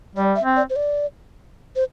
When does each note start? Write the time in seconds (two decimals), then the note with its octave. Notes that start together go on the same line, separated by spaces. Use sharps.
0.15 G3 D5
0.36 E5
0.43 C4
0.56 D5
0.70 C5
0.76 D5
1.76 C5